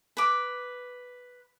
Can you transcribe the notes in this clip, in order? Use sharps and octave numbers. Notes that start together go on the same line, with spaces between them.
B4 D6